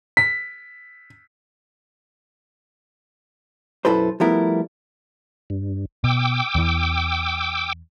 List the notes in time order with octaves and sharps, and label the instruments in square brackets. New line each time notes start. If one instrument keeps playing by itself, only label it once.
[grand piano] B6
[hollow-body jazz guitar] B1 F#2 E4 A4 B4 C5
F3 G3 A3 B3 E4 A#4
[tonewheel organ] G2
[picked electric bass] B2 [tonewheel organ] G5 D6 E6
[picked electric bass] E2 E3